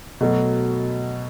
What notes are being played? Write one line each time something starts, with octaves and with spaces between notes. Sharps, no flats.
B2 F#3 A3